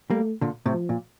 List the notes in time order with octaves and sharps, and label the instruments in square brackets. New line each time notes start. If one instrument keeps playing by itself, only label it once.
[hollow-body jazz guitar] G3 A#3 [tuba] A3
[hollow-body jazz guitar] A#2 D3
A2 C3
[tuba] F3
[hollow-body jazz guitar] A#2